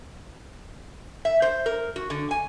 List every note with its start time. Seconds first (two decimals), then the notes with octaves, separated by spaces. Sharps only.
1.25 E5
1.42 C5
1.66 A#4
1.96 F#4
2.10 D3
2.31 G#5